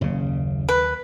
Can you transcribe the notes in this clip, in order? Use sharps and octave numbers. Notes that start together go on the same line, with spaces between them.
F#1 D#2 C#3
B4